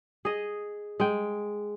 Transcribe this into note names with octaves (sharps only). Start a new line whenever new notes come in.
G#4 D#5
G#3 G5